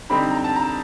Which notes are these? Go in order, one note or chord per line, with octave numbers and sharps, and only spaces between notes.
D3 G3 C4 D#4 B5
A#5
A5
A#5